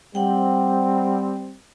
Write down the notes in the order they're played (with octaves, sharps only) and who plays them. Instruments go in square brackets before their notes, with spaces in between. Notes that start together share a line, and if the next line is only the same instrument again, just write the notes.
[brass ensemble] G3 C4 [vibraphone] F#5 G5